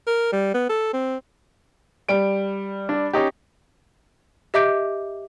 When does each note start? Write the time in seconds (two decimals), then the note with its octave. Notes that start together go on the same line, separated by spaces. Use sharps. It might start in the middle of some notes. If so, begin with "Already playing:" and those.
0.06 A#4
0.32 G3
0.54 B3
0.69 A4
0.93 C4
2.09 G3 D7
2.89 D4
3.13 C#4 D#4 G4
4.54 G4 D#5 E5 D6 G6 D7